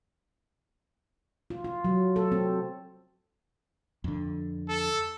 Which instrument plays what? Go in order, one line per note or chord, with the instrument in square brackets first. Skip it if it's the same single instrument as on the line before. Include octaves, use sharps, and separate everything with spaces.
[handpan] F4
F4
F#3
A4
C4
[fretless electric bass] F2 D3
[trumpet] A4